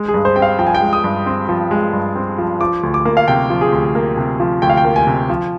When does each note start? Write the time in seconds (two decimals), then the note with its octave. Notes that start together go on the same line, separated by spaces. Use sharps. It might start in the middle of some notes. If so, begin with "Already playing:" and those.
Already playing: G#3
0.08 G#4
0.14 G2
0.25 C5
0.36 C4 G5
0.42 F5
0.59 F3 G5
0.67 G#5
0.74 G5
0.81 G#3
0.93 D#6
1.04 G2
1.26 C4
1.49 F3
1.71 G#3
1.93 G2
2.15 C4
2.38 F3
2.61 F3 D6
2.83 D2
2.94 D6
3.05 A#3
3.17 F5
3.28 C3 G5
3.50 F3
3.61 G#4
3.72 D2
3.95 A#3
4.17 C3
4.40 F3
4.62 D2 G5
4.70 F5
4.77 G5
4.85 A#3
4.96 G#5
5.07 C3
5.29 F3